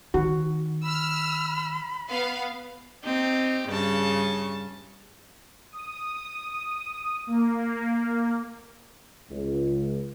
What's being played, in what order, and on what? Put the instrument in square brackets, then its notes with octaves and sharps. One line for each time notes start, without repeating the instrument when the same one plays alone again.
[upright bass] D#3 [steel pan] F#4
[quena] B5 [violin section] E6 F6
[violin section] B3 F5
[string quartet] C4 D#4 G4
G2 C#3 A5 C#6
[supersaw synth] D#6
A#3
[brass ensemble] C#2